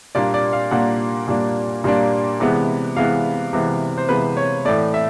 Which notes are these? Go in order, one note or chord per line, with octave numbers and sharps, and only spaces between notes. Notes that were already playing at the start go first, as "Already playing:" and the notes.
A#2 G3 A#3 D4 D5
D5
F5
A#2 G3 A#3 D4 F#5
A#2 G3 A#3 D4
A#2 G3 A#3 D4
C3 E3 G#3 B3
C3 E3 G#3 B3 F5
C3 E3 G#3 B3
C5
C3 E3 G#3 B3 B4
C#5
A2 E3 A3 D5
E5